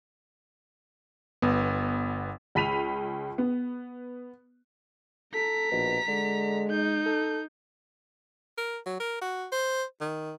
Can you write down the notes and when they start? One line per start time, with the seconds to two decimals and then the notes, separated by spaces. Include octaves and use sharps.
1.42 G1 B3
2.55 C#2 B5 B6 D#7 F7
3.38 B3
5.34 A4 A#5 B6
5.72 A#1 B2
6.08 D3 G#3
6.69 D#4 G6
7.06 A4
8.57 A#4
8.86 F#3
9.00 A#4
9.22 F#4
9.52 C5
10.01 D#3